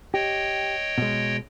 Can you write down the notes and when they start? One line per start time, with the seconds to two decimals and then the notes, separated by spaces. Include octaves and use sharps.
0.14 G4 C#5 D#5 G5
0.98 B2 G#3